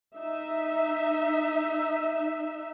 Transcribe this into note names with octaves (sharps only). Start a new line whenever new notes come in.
D#4 E5